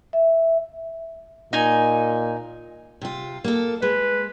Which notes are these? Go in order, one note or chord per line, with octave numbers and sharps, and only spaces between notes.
E5
A#2 D#4 G#5
C3 F4
A#3 A4
G#3 B4